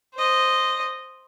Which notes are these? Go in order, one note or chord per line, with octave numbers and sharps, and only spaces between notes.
C5 D#5